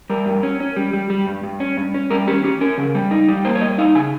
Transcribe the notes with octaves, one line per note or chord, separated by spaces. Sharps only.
G3 A#4
G2
C#4
C#4
G3
G3
G3
G2
G2
C#4
G2
C#4
G3 A#4
C#4 G4
C#4 G4
C#4 A#4
C#3
G3
D#4
G3
A#3 C5
C#5
G3 D#5
D#4 F5
C#3 G#5